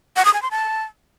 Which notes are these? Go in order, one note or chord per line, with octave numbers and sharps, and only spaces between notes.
F#5
D#6
G#5
C6
A5